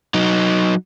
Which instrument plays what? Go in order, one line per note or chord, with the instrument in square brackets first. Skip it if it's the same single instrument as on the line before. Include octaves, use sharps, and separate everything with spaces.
[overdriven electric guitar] F#3 D#4